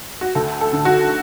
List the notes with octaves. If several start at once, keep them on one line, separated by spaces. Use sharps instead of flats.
F#4
D2 A4
A4
D3
F#4